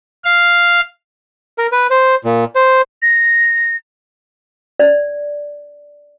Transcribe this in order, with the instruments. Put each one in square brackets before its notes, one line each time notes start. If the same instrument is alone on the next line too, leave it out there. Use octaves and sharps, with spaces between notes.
[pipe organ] F5
[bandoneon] A#4
B4
C5
A#2
C5
[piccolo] A#6
[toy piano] D5